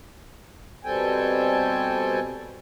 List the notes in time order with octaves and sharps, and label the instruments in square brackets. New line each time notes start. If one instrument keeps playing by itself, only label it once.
[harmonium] B2 G3 C4 A4 G5 G#5